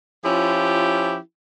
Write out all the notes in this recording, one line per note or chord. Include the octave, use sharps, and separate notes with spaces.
F3 C#4 E4 F4 G4